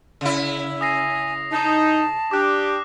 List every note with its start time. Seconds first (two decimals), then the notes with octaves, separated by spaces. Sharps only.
0.21 C#3 E4
0.81 G#5 D#6 A#6 C7
1.52 D#4 A5
2.31 D4 G4 D6 F#6